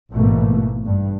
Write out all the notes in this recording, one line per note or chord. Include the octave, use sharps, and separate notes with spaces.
A1 G#2 B2 E3 A3 A#3
G2